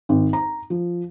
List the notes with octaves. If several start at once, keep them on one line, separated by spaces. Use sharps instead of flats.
G#1
A#5
F3